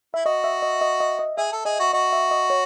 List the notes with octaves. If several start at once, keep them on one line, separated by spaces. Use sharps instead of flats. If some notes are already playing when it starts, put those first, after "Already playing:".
E4 E5
F#4 D#5
E5
D#5
D#5
D#5
D#5
G#4 E5
A4
G#4 D#5
F#4 E5
F#4 D#5
E5
D#5
C#5